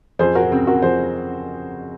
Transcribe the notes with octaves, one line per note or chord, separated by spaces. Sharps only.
F2 G#4 C5
F#4 A#4
C#3 C4
F#4 A#4
F2 G#4 C5